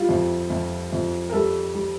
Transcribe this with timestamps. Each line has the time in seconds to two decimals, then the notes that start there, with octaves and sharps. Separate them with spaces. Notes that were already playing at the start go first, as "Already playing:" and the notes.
Already playing: G3 E4 F4
0.09 F2
0.50 F2
0.93 F2
1.29 A#4
1.33 G3 A4
1.75 G3